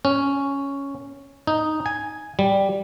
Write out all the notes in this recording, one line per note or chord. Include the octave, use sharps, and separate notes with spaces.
C#4
D#4
G#5
G3